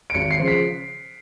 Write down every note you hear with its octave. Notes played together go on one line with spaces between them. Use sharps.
D7
G#1 C#7
C7
C#3 F3
B6